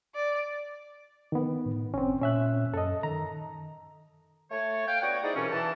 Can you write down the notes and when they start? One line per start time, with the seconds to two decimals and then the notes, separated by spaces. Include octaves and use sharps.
0.15 D5
1.32 D#3 B3
1.66 A2
1.94 F#1 C4 C#4
2.21 A#2 C#4 E5 F#6
2.74 F#2 A4 D#5
3.03 D#3 A#5
4.51 A3 C#5
4.87 F5 G5
5.02 B3 D4 F#4 C#5 F#5 G5
5.23 D#4 E4 G#4 C5 D5
5.36 C2 F#2 B2 E3 C#4
5.52 E3 A5